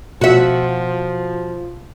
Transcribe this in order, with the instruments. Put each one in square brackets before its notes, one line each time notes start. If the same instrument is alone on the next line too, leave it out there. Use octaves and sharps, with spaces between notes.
[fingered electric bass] B2 [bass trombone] F3 [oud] F#4 E5